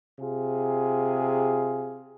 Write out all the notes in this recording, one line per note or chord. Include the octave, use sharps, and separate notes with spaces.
C3 F4 G#4